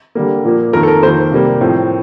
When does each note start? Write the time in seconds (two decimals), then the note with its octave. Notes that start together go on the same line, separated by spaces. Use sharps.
0.15 D3 G3 A#3
0.45 A#2 F3 A#3
0.73 F2 D#3 A#3 A#4
0.83 A4
0.88 A#4
1.03 F2 D#3 A#3 C5
1.32 C3 G3 A#3
1.61 A2 F3 C4